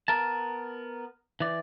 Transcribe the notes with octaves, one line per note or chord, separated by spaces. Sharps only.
B3 A#4 A5
E3 D5